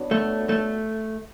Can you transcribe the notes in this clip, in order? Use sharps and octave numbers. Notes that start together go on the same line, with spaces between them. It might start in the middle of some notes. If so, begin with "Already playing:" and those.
Already playing: B3 D4 F#4 C#5
A3
A3